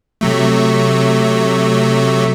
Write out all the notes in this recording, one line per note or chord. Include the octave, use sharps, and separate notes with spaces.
C3 F#3 A3